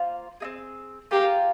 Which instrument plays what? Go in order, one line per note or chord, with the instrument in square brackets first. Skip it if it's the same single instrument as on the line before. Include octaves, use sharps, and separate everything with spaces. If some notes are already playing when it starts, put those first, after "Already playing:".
Already playing: [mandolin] A#3 F4 C5 F5
C4 D#4 G#4
[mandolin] F4 A#4 F5 G#5 [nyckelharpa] G4